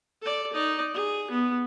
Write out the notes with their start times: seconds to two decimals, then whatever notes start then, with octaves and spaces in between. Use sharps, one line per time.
0.22 A4 D5
0.53 D#4 D5
0.94 G#4
1.31 B3